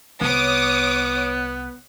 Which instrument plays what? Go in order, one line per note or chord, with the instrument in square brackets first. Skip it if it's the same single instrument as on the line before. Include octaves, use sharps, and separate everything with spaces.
[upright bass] C2 [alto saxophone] B3 [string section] C#5 D6 D#6